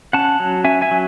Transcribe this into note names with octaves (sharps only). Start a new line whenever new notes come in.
C#4 F#5 A5
F#3
C#4 E5 G#5
E5 G#5
F#3